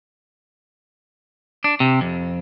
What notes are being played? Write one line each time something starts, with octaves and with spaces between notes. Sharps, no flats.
D4
C3
F2